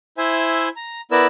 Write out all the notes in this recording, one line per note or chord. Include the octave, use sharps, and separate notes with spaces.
E4 C5 E5 G#5
A#5
B3 E4 A#4 B4 D5 E6